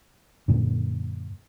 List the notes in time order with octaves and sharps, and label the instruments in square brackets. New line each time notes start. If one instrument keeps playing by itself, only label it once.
[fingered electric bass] F#2 A#2 D3